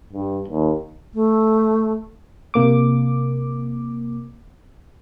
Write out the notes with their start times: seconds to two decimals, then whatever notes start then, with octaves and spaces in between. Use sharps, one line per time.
0.13 G2
0.48 D#2
1.14 A3
2.54 C3 A#3 D6